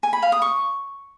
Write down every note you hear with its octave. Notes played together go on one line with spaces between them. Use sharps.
G#5
B5
F5
D#6
C#6